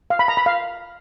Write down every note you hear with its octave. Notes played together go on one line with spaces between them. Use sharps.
F5
B5
A#5
B5
F5